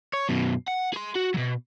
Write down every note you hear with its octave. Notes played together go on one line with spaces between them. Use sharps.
C#5
F#2 B2
F#5
G#4 C6
F#4
B2 F#3